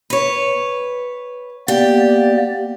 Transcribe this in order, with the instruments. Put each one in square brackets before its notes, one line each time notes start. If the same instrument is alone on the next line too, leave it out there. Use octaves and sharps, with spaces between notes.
[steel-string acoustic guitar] B4 C#5
[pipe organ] A#3 B3 D5 [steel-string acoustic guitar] G4